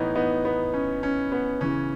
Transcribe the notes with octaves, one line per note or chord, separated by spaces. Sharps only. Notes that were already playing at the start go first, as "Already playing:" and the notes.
Already playing: A2 E3 B3 D#4
B3 D#4
B3
C#4
C#4
B3
C#3 E3 C#4